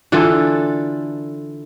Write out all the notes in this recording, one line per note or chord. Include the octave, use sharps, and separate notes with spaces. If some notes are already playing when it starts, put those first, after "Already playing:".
D3 E3 F4 A4